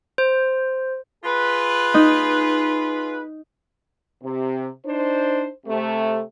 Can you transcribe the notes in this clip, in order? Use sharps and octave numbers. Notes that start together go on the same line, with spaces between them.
C5
F4 G#4 B4
D#4
C3
D4 D#4 C5
C3 A3